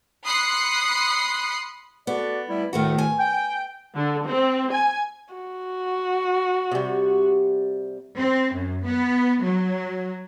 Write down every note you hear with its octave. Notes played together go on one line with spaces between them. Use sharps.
B5 C6 D#6 F#6 C7 C#7
B3 F#4 A4 D5
G3 A3 E4
D2 A2 D#3 A3 B3 F#4
G#5
G5
D3
C4
G#5
F#4
C3 G3
C4
F#2
B3
F#3